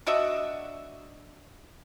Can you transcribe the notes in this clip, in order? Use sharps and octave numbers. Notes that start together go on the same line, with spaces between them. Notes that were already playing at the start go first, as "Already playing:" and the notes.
D4 F#4 D#5 E5